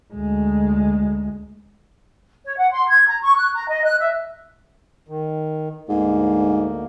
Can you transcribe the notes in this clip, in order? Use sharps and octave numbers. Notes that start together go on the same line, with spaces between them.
D2 G#3
C#5
F#5
C6
G#6
A#5
C#6
F#6
A#5
D#5
F#6
E5
D#3
D2 G#2 A#3